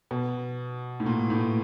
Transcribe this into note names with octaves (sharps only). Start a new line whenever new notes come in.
B2
A2
A#2
A2